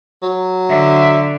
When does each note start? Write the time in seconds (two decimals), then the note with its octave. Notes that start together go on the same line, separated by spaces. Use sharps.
0.23 F#3
0.69 D3 E5